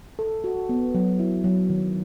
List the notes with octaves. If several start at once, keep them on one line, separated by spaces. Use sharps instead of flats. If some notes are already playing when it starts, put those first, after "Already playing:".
A4
F#4
B3
F#3
E4
F#3
D#3